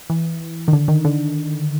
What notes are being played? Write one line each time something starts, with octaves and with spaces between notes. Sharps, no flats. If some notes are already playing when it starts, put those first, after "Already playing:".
E3
D#3
D3
D#3
D3